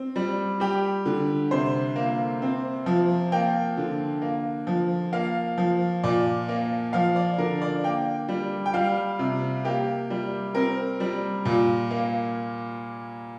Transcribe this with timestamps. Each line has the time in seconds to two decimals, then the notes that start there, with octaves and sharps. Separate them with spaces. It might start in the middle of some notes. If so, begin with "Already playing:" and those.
Already playing: C4
0.16 G3
0.60 G3 G4
1.06 D3
1.51 C3 C5
1.96 A#3
2.42 C4
2.86 F3
3.32 A#3 G5
3.77 D3
4.22 A#3
4.67 F3
5.13 A#3 F5
5.58 F3
6.04 A#2 D5
6.49 A#3
6.93 F3 F5
7.16 D5
7.38 D3 A#4
7.62 D5
7.84 A#3 G5
8.29 G3
8.66 G5
8.74 G3 F5
9.19 C3
9.65 A#3 G4
10.10 G3
10.55 C4 A#4
11.00 G3
11.45 A#2
11.91 A#3